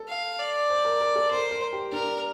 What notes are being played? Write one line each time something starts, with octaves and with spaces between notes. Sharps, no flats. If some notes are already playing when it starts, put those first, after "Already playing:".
Already playing: A4
F5
D5
C5
A#4
A#4
A4
A#4 C5
A#4
G4
D4 A#4